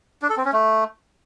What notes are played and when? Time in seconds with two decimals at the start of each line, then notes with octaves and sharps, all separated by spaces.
0.22 D4
0.30 A4
0.37 C4
0.45 C#4
0.53 A3